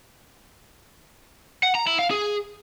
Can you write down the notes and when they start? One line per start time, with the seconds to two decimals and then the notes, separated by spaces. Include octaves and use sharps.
1.63 F#5
1.75 A#5
1.87 E4
1.99 F5
2.11 G#4